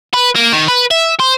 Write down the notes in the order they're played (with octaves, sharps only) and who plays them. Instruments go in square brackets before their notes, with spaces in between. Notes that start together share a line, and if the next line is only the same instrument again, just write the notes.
[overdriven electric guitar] B4
A#3
D#3
B4
E5
C5